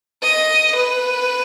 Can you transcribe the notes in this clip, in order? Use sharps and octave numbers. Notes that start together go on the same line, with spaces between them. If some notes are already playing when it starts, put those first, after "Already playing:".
D#5
B4